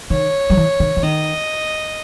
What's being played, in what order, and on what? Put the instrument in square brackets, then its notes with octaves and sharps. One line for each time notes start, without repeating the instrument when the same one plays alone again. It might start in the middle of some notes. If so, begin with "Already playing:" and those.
[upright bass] D#3 [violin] C#5
[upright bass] F#3
E3
D#3
E3
[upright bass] D#3 [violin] D#5